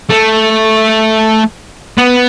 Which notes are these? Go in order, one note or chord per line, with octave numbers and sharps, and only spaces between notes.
A3
B3